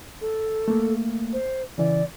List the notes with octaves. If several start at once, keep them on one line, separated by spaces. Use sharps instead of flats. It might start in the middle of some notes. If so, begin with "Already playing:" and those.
A4
A3 A#3
C5
C#3 E3 D5